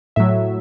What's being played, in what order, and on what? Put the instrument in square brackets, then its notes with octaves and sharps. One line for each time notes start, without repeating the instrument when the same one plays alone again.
[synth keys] A2 F#3 E5